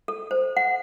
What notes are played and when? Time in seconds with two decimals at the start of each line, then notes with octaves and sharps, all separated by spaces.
0.08 A4
0.31 C5
0.57 F#5